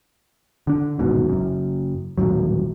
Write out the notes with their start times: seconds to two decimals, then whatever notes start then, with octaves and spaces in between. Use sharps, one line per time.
0.67 D3 D4
0.99 D#1 C2 G#2 B2
1.29 F#1 F#2
2.18 D#1 A1 G#2 F#3